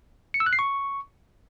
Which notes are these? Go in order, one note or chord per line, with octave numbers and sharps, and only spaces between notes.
C#7
E6
F#6
C7
C#6